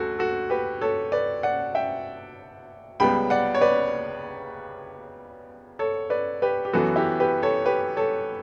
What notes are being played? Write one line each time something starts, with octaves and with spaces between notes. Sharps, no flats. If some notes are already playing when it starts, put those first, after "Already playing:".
Already playing: D2 F#4 A4
F#4 A4
G4 B4
A4 C#5
B4 D5
D5 F#5
E5 G5
C#2 C#3 G3 B3 G5 B5
D5 F#5
C#5
B4 D5
A4 C#5
B4 D5
G4 B4
G4
F#2 E3 B3 F#4 A4
E4 G4
G4 B4
A4 C#5
G4 B4
A4 C#5